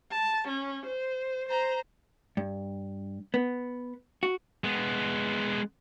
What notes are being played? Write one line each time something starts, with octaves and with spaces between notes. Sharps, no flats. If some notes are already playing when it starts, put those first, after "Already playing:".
A5
C#4
C5
C5 A#5
G2
B3
F#4
G#3 B3